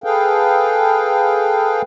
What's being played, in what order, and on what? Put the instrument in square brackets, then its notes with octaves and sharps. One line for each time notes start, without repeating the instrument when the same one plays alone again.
[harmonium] G#4 A4 B4 F5 G5